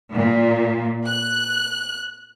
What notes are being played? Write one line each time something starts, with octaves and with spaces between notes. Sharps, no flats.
A#2
F#6